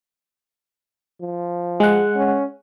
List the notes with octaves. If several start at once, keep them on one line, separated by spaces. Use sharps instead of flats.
F3
G#3 F#5
C#4